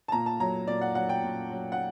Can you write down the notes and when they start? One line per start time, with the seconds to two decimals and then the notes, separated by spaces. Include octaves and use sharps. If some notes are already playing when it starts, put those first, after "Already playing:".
0.08 A5
0.12 A#2 A#5
0.26 A5
0.40 F#3 A#5
0.68 A#2 D5
0.81 F#5
0.95 F#3 F#5
1.09 G5
1.23 A#2
1.51 F#3
1.72 F#5